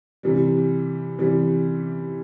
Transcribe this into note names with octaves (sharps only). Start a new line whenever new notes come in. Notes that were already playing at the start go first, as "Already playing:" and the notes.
C3 E3 G3
C3 E3 G3